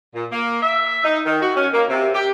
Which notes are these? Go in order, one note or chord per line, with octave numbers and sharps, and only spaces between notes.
A#2
A#3
E5
D#4
D#3
F#4
C#4
A#3
C3
G4